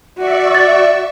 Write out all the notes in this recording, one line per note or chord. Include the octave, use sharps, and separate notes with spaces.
F#4 D5 E5 C#6
A6